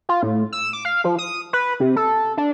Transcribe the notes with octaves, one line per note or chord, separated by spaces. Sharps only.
F4
A2
E6
D6
F5
F3
D#6
B4
C3
A4
D4